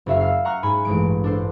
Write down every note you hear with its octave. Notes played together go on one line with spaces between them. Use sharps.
F#1 F#4 E5 F5
F5 E6
F#5 A#5 C#6 F6 F#6
G#2 G#5 B5
A1 G2 G#3 D7
D4 A4 C5